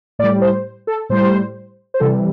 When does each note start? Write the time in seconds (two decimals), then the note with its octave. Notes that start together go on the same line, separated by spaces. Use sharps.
0.19 A2 D5
0.24 G3
0.42 C5
0.87 A4
1.10 A2 G3 C5
1.94 C5
2.00 C3 E3 G3 A4